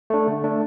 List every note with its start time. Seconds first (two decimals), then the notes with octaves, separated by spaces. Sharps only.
0.10 A3 D4
0.28 D3
0.44 A3 D4